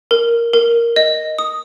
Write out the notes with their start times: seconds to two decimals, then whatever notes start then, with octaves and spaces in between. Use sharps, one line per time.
0.11 A#4
0.54 A#4
0.96 D#5
1.39 D#6